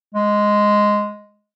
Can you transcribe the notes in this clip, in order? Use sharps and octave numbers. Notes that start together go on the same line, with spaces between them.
G#3